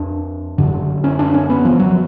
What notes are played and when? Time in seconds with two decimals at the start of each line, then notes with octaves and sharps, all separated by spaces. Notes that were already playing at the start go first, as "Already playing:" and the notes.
Already playing: F2 D4
0.58 F#2 D3
1.04 C#4
1.19 D4
1.34 C#4
1.49 B3
1.65 F3
1.80 F#3